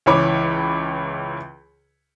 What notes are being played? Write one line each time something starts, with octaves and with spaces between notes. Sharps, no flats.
C#2 E3 C#5 B5 D6